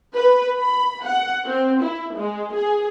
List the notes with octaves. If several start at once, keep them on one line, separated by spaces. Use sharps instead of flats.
B4
B5
F#5
C4
E4
G#3
G#4